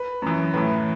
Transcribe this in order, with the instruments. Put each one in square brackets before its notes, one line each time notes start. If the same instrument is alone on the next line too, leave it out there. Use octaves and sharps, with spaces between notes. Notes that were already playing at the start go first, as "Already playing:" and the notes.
Already playing: [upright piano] B4
F#2 E3
A2 E3 B4